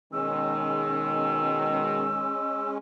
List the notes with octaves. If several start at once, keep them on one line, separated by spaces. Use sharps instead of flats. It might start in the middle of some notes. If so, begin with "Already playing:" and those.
B2 D#3 G#3 C#4 E6